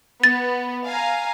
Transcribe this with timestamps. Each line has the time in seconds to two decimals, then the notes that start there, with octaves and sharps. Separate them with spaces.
0.24 B3 A6
0.88 F5 G#5 A#5